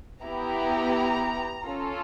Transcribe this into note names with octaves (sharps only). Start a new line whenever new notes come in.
B3 E4 G4 A#5
C#4 F4 A4